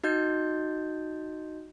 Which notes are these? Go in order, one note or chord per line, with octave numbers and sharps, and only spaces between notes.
D#4 F#4 D#5 G6